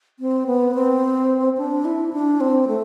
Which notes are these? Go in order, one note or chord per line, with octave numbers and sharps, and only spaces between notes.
C4
B3
C4
D4
E4
D4
C4
A3